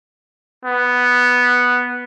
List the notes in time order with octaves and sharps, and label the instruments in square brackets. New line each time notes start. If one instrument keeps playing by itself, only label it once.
[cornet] B3